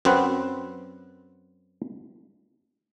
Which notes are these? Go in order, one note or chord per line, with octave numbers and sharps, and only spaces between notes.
F#2 C4 B4 F#5